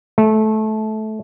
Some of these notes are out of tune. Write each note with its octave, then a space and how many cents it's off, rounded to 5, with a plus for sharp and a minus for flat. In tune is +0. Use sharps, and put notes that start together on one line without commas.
A3 -20